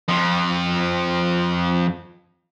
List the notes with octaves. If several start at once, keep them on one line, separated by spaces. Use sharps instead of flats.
F2 F3